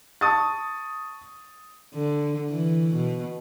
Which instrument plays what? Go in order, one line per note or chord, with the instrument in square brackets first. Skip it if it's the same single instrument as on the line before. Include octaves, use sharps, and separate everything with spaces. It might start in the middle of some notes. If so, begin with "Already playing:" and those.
[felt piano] A5 C#6 D#6 A6
[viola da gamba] D3
E3
B2